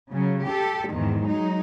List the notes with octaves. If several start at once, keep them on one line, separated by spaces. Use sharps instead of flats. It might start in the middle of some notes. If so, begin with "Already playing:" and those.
C#3 F#3
G4 A4
E2 G#2 D#3
F#3 G#3 D#4